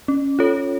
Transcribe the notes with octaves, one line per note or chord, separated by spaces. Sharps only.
C#4
F4 A4 C#5